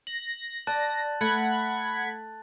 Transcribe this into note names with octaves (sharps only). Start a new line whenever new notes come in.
A#6 F#7
D5 A5 F#6 A6
A3 F#5 B5 G#6